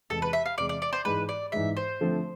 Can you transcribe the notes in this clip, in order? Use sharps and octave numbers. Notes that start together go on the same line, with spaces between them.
E2 C3 G#3 A4
B4
E5
F5
E2 C3 G#3 D5
D5
D5
C5
G#2 E3 G#3 B4
D5
G#2 E3 G#3 E5
C5
D3 F3 A3 C4